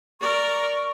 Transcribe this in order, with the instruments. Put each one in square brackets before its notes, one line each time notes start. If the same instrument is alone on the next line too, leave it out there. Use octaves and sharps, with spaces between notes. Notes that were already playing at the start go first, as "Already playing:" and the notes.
[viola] A#4 D5 [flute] C#6